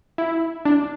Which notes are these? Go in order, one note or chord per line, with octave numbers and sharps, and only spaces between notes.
E4
D4